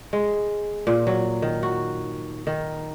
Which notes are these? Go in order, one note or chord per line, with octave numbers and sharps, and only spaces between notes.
G#3
A#2
F#3
D#3
F#4
D#3